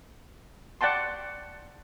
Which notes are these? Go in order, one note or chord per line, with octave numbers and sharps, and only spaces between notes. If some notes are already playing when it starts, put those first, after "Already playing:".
D5 F#5 G5 A5 C6